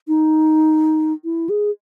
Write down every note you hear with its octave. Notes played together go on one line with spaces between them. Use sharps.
D#4
E4
G#4